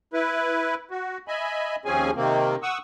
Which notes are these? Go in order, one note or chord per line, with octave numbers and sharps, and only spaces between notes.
E4 B4
F#4
D#5 E5 G#5 B5
D#2 F3 C4 C#4 G#4 G#5
C3 D#3 A#3 C4
F#5 C#6 D#6 E6